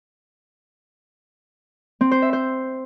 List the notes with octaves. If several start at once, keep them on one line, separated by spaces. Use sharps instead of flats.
C4
C5
E5
C5